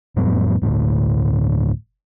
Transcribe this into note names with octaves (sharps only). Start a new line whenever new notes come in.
F2 A2 F#3 B3
G1 D2 A2 D3